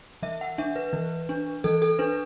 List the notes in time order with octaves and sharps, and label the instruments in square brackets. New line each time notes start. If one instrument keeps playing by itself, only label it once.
[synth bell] E3 E5
F#5
D4 E5
B4
E3
D4
E3 A4
A4
D4 B4